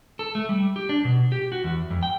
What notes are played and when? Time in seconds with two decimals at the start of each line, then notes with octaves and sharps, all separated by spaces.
0.19 A4
0.35 A3
0.49 G3
0.76 G4
0.89 D4
1.05 B2
1.32 G4
1.52 F#4
1.64 E2
1.90 F2
2.03 G5